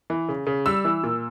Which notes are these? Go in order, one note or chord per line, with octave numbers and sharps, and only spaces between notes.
E3
C#3
C#3
G3 E6
E3
A#2